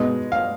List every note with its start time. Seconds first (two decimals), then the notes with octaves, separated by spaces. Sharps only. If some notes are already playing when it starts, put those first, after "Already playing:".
Already playing: B2 G#3 B3 D#4
0.32 F5